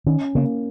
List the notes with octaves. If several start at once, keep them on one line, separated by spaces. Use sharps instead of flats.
D#3 C#4
C#3 A#3